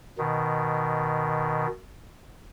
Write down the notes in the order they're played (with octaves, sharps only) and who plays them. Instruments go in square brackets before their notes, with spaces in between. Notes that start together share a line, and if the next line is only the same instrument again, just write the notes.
[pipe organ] B2 D#3